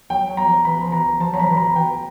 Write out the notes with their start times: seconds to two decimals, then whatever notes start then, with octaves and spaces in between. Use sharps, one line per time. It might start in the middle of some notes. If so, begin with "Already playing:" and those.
0.10 F#3 G5
0.29 F#3
0.37 A#5
0.47 F3
0.65 E3 B5
0.79 F3
0.92 E3 A#5
1.20 F3 A5
1.33 F#3 A#5
1.39 F3 B5
1.50 E3
1.53 B5
1.57 F3 A#5
1.75 E3 G5